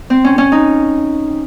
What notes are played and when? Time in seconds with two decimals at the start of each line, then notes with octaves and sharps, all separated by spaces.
0.10 C4
0.24 C#4
0.38 C#4
0.52 D#4